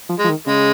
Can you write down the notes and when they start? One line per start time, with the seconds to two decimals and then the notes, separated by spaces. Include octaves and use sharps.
0.10 F3
0.19 G#3
0.24 F3
0.29 D#3
0.47 C#3 G#3